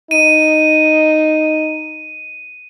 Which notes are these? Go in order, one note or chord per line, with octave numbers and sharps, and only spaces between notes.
D#4 D#7